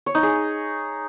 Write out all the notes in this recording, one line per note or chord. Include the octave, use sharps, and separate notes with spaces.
C#5
D#4
G#4